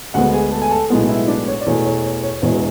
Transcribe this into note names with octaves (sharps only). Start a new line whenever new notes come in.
D2 D3 G#3 B3 F#4 F#5
G#4 G#5
A4 A5
G#5
A4 A5
B1 A2 G#3 B3
E4 E5
D4 D5
C#5
D5
E2 B2 A3 C#5
C#5
C#5
C#5
E1 E2 B2 C#5